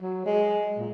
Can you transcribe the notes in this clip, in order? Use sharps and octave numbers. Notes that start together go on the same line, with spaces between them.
F#3
G#3
A#2